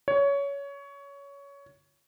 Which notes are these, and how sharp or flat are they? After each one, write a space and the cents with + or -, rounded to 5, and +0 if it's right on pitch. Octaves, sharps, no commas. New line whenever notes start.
C#5 +20